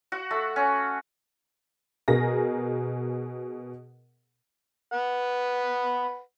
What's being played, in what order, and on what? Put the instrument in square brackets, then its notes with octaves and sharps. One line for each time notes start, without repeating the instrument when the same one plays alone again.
[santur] F#4
A3
C#4
[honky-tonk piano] B2 G#4 A#4 A#6
[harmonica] B4 F#5